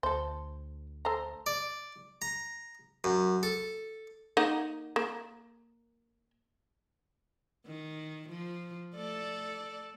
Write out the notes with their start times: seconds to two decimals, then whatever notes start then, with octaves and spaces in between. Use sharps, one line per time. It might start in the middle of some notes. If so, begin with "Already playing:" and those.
0.03 D2 A4 C5
1.05 A4 C5 A#5
1.46 D5
2.22 A#5
3.04 F#2
3.43 A4
4.37 A#3 D#4 F#5
4.96 A#3
7.67 D#3
8.30 F3
8.95 A3 A4 D5